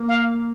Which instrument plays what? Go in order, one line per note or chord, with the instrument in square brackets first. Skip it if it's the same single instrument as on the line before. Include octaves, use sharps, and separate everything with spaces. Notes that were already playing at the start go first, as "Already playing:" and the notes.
Already playing: [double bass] A#3
[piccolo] F5